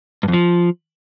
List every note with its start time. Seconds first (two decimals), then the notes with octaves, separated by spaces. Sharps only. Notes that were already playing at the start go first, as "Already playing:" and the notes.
0.23 G2
0.28 F2
0.33 F3